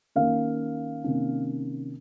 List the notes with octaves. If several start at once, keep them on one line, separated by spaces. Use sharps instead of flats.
D#3 A#3 C#4 F5
C3 D#3 A#3 C#4